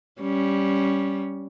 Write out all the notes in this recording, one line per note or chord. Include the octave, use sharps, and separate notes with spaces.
G3 C#4